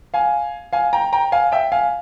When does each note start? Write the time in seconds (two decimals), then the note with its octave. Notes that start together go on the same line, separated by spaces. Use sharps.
0.14 F5 G#5
0.73 F5 G#5
0.93 G5 A#5
1.13 G5 A#5
1.32 F5 G#5
1.52 E5 G5
1.72 F5 G#5